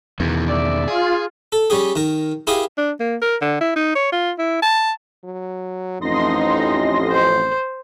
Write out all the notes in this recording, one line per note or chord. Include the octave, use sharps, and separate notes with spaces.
E2 B2 D#3 E3
D5 E5
F4 G#4
A4
G3 C#4 G4 G#4
D#3 A#4
E4 G4 G#4 A#4 F5 D#6
D4
A#3
A#4
D3
E4
D#4
C#5
F4
E4
A5
F#3
A1 F2 D#4 D#5 C6 A#6
C5